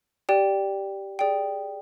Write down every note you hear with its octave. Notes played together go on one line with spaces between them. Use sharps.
G4 D5 G5
G#4 D5 G5